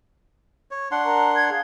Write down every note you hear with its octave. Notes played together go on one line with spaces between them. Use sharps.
C#5
D4 F#5 C6
A#4 A#5
G#6
G#4 F5